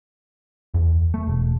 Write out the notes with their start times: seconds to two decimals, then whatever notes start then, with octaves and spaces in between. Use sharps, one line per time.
0.74 E2
1.14 A3
1.27 E1